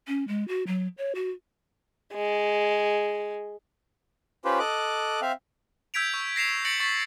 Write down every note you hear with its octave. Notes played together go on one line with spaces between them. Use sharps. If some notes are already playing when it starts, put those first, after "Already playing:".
C#4
G#3
F#4
F#3
C#5
F#4
G#3
C#4 F4 G4 B4 C5
A4 D#5 D6 F#6
C4 E5 F5
E6 G6 G#6 B6 D7 F7
C#6 E6
A#6 C7 E7 F7
G6 A6 A#6 C#7 D7 F#7
C#6 A6 B6